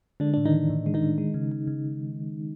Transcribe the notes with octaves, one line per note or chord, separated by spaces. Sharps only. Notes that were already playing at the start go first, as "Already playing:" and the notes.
D3 G#3 D4
A2 D4
D#3 D#4
E3
A2
G#3
D#3 D#4
A2
G#3
C#3
C#3
C#3